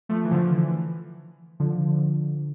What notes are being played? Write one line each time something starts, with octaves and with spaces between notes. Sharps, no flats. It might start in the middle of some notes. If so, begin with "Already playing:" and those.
F3 A3
E3
D3 F3
E3
D3 F3